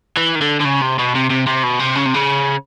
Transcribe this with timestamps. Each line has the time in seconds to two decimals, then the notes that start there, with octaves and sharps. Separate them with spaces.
0.17 E3
0.36 D#3
0.42 D3
0.61 D3
0.65 C#3
0.82 C3
0.99 B2
1.15 C3
1.30 C3
1.47 C3
1.63 B2
1.79 C3
1.95 C#3
2.05 C3
2.14 C#3